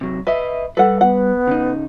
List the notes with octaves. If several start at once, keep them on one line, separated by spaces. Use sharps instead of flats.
C3 F#3
B4 D#5 E5
G3 A4 B4 F#5
B3 F#5
C#3 D#4